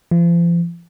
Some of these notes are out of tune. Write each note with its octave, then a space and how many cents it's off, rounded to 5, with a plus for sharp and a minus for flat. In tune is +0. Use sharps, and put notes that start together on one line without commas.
F3 -40